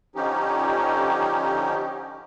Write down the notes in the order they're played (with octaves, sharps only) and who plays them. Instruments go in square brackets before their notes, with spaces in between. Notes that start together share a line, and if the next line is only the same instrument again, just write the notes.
[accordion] D3 F3 C#4 D#4 G4